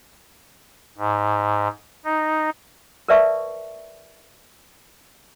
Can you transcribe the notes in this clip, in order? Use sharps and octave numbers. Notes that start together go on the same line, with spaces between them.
G#2
D#4
A#4 B4 D5 E5 A5 C#6